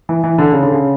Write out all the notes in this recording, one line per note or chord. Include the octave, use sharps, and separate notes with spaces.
E3
E3
D3
C#3
D3
C#3